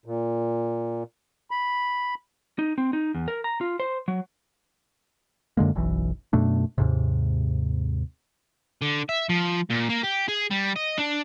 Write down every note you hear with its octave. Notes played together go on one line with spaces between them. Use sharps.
A#2
B5
D#4
C4
D#4
E2
A#4
A#5
F4
C5
F#3
F#2 D3 G#3 A#3
F#1 B1 E3
F#2 B2 A3 D4
D#2 G#2 C3
D3
E5
F3
A#2
A#3
G4
G#4
G3
D#5
D4